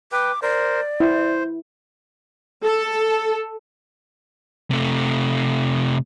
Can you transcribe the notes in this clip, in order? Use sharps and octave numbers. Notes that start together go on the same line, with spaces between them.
B4 G5 D6
A#4 C5 D5
E4 C5
A4
C3 A3